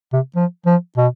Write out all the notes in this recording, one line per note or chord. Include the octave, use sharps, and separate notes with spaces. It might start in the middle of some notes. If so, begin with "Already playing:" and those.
C3
F3
F3
B2